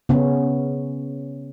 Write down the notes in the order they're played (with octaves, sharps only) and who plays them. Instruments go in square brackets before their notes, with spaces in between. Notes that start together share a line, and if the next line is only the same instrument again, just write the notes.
[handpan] C#3 B3 C#4